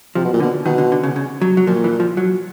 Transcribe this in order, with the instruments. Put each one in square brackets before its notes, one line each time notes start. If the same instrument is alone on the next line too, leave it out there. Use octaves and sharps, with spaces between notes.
[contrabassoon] C3 [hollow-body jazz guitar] F3
[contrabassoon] B2
A#2
[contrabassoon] B2 [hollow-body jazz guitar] D3
[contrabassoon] B2 [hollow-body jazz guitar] D#3
[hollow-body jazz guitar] D3
D3
C#3
C#3
F#3
F#3
[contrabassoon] A#2 [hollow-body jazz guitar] F3
[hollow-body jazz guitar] E3
F3
F#3